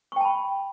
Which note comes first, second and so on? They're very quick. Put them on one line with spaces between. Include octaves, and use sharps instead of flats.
C#6 G5 A5 B5